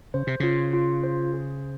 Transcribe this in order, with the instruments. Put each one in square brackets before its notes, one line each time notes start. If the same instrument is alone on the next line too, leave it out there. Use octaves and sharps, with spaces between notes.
[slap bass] C#3 [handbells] C5
[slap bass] C3
[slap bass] C#3 [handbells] F4
[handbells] F4
C5
G#4